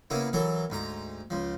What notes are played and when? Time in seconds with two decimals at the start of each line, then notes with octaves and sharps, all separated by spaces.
0.10 C#3 A#3 B3 E4
0.33 E3 F#3 A4 A#4
0.70 D2 G#2 A#5
1.30 C#2 F3